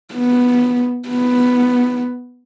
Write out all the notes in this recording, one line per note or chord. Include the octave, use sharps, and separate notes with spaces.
B3
B3